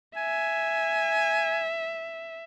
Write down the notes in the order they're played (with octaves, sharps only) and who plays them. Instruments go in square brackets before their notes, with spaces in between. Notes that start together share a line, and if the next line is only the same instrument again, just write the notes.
[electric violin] E5 [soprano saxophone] G#5